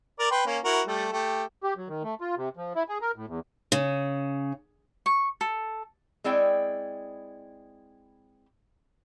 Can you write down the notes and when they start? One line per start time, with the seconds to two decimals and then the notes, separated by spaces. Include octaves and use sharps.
0.19 A#4 D5
0.31 B4 G5 C6
0.46 A#3 C#4
0.64 E4 F#4 A#4
0.87 G3 A3
1.12 A3 G4
1.63 G4
1.77 F#3
1.88 D#3
2.03 A3
2.21 F4
2.37 C3
2.57 F3
2.75 E4
2.89 G#4
3.01 A#4
3.16 A2
3.27 E2
3.72 C#3
5.06 C#6
5.41 A4
6.24 G#3 C4 E4 D5 G5